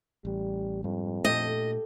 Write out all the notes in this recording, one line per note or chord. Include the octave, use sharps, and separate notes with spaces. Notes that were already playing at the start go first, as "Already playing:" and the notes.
A1 G3
F2 G#2 G3
A#2 A3 D4 G4 A4 D#5